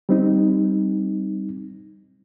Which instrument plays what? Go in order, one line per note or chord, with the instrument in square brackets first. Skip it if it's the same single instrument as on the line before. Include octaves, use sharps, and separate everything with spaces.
[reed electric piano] G3 C4 D#4